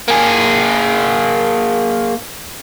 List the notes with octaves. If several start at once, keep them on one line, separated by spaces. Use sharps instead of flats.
A#3 G#4